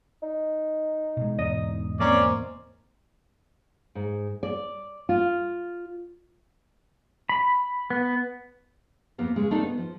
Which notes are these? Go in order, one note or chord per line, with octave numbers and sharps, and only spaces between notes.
D#4
B2 G#3
E2 G#2 B2 D#5
A#3 C4 C#4 D5
G#2
D5
F4
B5
B3
F2 A#3 B3
C#3 G#3
A3 A#3 C4 D4 D#4 A4
B3
F3